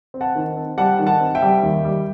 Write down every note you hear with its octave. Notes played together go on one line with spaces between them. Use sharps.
C4
F#5 A5
D#3
C4
G3 F#5 A5
D#3
F#5 A5
C4
E5 G5
G3
D#2
G3